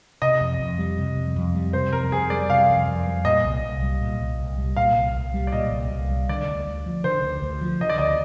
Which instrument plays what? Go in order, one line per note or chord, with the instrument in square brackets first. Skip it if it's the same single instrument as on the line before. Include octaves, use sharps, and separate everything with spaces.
[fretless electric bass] C3 [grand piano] D#5
[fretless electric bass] F2
F2
G3
C3
F2
F2
G3
[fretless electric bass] C3 [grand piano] C5
[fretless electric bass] F2 [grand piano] A#4
[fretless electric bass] F2 [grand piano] G#4
[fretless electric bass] G3 [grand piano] D5
[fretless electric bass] C3 [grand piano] F5
[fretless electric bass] F2
F2
G3
[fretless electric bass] A#2 [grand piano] D#5
[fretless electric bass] C2
C2
G3
A#2
C2
C2
G3
[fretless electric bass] A#2 [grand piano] F5
[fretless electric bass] C2
C2
G3
[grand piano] D5
[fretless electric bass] A#2 [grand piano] D#5
[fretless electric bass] C2
C2
G3
[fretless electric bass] D3 [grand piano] D5
[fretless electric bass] D2
D2
F3
[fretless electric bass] D3 [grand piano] C5
[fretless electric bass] D2
D2
F3
[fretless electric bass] D3 [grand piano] D#5
[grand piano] D5
[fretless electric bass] D2 [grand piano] D#5